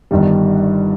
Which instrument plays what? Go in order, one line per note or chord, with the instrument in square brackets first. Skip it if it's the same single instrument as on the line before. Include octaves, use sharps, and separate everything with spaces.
[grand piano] G1 G2 D#3 G3